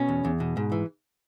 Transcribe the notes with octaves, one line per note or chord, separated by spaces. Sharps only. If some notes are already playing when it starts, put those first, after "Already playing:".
Already playing: B2 C#4
E2
E2
B2
G#2
E3